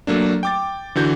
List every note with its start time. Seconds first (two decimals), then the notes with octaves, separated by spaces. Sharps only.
0.07 F#3 A3 A#3 D4
0.43 G5 D6 A6
0.95 D3 E3 F#4 G6